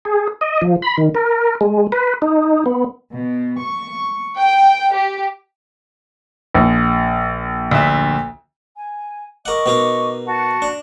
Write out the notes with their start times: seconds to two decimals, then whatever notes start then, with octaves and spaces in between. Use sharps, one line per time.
0.05 G#4
0.41 D#5
0.62 F3
0.82 B5
0.98 D#3
1.15 A#4
1.61 G#3
1.92 B4
2.22 D#4
2.66 B3
3.17 B2
3.64 C#6
4.37 G5
4.94 G4
6.54 A#1
7.71 D2 E5
8.75 G#5
9.46 A#4 D#5 F#5 C#6 D6
9.66 B2 D#4 A#4
10.26 F#4 F#5 A5
10.62 D4